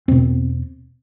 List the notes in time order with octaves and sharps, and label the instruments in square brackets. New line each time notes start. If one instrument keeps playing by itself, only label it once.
[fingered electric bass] E2 B2 C4